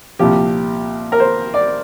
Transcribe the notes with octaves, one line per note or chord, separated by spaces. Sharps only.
C2 A#2 F3 G4
A#4
C5
D5